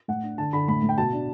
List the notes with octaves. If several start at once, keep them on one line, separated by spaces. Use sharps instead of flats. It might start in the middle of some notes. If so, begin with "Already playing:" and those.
A2 F#5
D4
D3 A5
D3 B5
A2 B5
A2
G5
B2 A5
D4